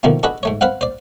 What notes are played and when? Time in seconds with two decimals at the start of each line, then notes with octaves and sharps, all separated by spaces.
0.03 B2 D#3 F3 A3 A#3 C4
0.23 D4 F#4 G#4 A4 B4 D#5
0.43 G#2 A3 C#5
0.61 C4 B4 C5 F5 F#5
0.81 C5 D5